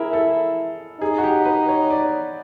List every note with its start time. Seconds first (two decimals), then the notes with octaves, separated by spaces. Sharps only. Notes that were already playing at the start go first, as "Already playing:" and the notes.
Already playing: E4 G#4 A#4
0.13 A4
1.01 D#4 G#4
1.18 F#4
1.23 G4
1.45 B4
1.68 C#5
1.90 D5